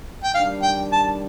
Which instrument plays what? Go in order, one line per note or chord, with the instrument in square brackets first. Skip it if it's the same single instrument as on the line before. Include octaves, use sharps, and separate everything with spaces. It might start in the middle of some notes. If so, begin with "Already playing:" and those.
[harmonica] G5
[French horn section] D#3 G3 D4 [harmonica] F5
[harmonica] G5
A5